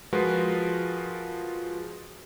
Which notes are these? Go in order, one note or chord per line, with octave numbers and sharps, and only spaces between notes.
F3 G#3 F4 F#4 A#4 B4